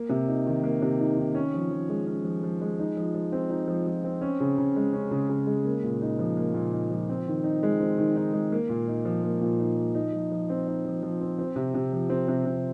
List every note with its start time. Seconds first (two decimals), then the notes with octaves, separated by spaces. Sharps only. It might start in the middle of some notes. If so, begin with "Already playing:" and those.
Already playing: A#3
0.09 C3
0.28 D#4
0.46 D#3
0.64 A#3
0.82 C3
1.00 D#4
1.17 D#3
1.35 C#4
1.54 F3
1.71 F3
1.89 G#3
2.07 C#4
2.24 F3
2.43 F3
2.61 G#3
2.79 D#4
2.97 F3
3.14 F3
3.32 C4
3.50 D#4
3.68 F3
3.86 F3
4.04 C4
4.21 C#4
4.40 C#3
4.58 C#3
4.76 G#3
4.93 C#4
5.11 C#3
5.29 C#3
5.47 G#3
5.65 A#3
5.83 A#2
6.02 D#4
6.19 F3
6.37 A#3
6.54 A#2
6.72 D#4
6.90 F3
7.09 C4
7.27 D#3
7.44 D#4
7.63 G#3
7.80 C4
7.98 D#3
8.16 D#4
8.33 G#3
8.52 A#3
8.69 A#2
8.88 D#4
9.05 F3
9.23 A#3
9.41 A#2
9.60 D#4
9.77 F3
9.95 D#4
10.12 F3
10.32 F3
10.50 C4
10.67 D#4
10.85 F3
11.03 F3
11.21 C4
11.38 C4
11.56 C3
11.74 C3
11.92 F3
12.10 C4
12.28 C3
12.46 C3